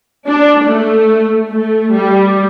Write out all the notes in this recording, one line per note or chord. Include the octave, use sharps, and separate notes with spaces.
D4
A3
A3
G3